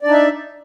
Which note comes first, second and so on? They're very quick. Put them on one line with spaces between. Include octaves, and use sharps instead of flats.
D5 D4 D#4 E5